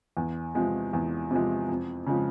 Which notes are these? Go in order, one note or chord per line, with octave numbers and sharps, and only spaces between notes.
E2
C3 F3 G#3
E2
C3 F3 G#3
F2
C#3 F3 G#3